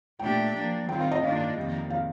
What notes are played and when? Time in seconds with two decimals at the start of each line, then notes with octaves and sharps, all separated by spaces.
0.19 A#2 A3 D4 G4 G5
0.54 F3 A#3 D4
0.88 D#3 G3 C4 F4 G5
1.00 F5
1.12 D#5
1.23 G2 D#3 A#3 D4 F4 F5
1.57 F2 C3 D#3 G3 A#3
1.90 F5